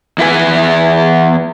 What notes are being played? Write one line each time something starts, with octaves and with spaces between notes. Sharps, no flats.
E2 E4 F4 B4 G#5